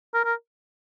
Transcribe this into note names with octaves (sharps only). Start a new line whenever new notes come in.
A#4
A#4